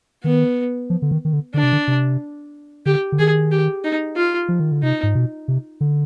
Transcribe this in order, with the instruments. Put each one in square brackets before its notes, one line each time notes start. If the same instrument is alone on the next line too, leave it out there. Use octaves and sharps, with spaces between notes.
[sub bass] D#3 [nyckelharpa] B3
[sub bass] F3
D3
D#3
D#3
D3
[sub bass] D3 [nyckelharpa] D4
[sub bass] C3
D3
C3
[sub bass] D3 [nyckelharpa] G4
[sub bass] D3
[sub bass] D#3 [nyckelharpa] G#4
[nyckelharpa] G4
D#4
F4
[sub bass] F3
D#3
D3
[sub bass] C3 [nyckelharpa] D#4
[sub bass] G#2
B2
C3
D3